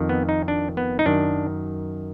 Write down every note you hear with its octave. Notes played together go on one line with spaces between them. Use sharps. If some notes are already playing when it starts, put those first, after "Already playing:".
Already playing: F2 D#3
B3
D#4
D4
B3
D#4
F#2 D#3 D4